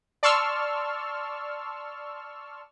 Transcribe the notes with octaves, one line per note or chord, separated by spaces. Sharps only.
D5 A5 C6 C#6 E6 F6